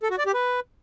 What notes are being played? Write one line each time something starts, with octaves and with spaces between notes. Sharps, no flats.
A4
F#4
D5
G4
B4